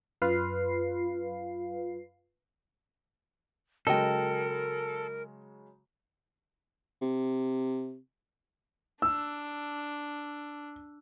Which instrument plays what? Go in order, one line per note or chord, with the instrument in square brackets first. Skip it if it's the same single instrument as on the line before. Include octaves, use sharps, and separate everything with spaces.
[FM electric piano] F#2 F4 B4 F5 C7
[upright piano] C#3 F#3 G#3 [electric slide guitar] A4 [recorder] A#4 [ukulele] D#5 G5
[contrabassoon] C3
[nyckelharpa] D4 [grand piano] E6